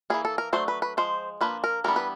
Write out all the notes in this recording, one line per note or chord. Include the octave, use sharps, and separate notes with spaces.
E3 G3 A#3 G#4
A4
A#4
F#3 A3 D4 C5
B4
B4
F3 G#3 C5
F3 A#3 D4 B4
A#4
E3 G3 B3 D4 A#4
B4